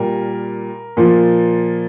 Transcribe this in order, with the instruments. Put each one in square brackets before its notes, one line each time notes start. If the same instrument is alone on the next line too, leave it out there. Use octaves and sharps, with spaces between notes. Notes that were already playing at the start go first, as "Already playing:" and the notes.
Already playing: [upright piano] A#2 G3 A#4
A#2 F3